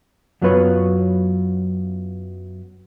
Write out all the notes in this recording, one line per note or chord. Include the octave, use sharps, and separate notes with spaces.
F#2 F#3 B3 F4 B4 C#5